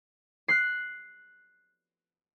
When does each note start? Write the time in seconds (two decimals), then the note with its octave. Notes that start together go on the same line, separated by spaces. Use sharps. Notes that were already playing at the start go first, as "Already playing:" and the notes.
0.48 F#6 C7